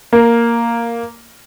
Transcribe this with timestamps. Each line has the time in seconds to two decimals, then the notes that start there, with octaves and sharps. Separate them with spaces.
0.13 A#3